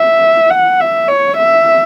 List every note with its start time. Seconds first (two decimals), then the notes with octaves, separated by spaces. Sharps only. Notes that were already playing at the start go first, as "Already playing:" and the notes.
Already playing: E5
0.50 F#5
0.80 E5
1.08 C#5
1.38 E5